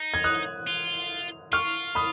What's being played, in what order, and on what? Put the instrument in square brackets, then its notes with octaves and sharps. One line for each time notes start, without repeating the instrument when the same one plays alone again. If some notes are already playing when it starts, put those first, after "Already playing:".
Already playing: [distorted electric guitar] D#4
[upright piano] G#6
D#6 F#6
[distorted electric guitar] F4
[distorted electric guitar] F4 [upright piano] C#6 F6
[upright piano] B5 D#6